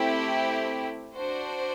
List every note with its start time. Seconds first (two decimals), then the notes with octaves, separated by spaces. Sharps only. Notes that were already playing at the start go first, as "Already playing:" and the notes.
Already playing: A3 C4 E4 G4
1.12 D4 F#4 C5